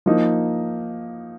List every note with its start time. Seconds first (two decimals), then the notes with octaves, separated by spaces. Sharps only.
0.06 F3 A#3 D#4